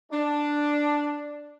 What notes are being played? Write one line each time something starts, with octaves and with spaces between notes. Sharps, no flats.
D4